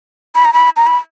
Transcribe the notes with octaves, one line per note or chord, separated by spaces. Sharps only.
B5
A#5
B5
A#5
B5